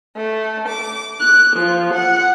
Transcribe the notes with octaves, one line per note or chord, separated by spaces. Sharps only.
A3
D6
F#6
F3
F#5